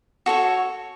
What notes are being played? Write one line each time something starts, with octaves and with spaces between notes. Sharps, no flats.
F#4 A4 C#5